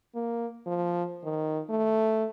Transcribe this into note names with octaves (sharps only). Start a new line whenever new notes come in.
A#3
F3
D#3
A3